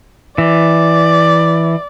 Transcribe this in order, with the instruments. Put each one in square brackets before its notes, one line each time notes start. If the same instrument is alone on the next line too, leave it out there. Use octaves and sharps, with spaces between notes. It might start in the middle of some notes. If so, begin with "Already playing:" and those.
[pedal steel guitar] E3 [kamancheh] D5